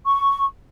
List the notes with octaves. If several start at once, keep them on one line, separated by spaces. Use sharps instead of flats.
C#6